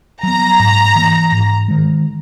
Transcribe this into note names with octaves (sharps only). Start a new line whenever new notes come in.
F#3 B3 A#5
G#2
E3 A#3
G#2
D#3 G#3